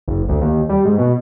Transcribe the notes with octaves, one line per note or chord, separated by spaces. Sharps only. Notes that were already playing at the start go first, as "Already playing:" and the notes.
F#1
D2
D#2
G3
G#2
B2